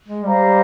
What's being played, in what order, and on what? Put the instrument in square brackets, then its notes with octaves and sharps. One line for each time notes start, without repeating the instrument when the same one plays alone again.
[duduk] G#3
[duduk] G3 [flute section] G4 C5 F5 A#5